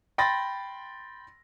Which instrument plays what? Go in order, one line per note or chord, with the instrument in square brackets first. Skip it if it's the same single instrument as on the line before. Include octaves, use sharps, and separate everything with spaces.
[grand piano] G5 B5 C6 A6 A#6